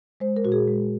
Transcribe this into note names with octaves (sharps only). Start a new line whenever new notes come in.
G#3 C5
A#4
A#2 F#4
G#4
G#3